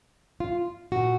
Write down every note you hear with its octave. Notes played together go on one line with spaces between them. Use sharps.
F4
A#2 F#4